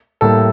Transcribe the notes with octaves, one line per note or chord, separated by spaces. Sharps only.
A2 G3 A#3 A4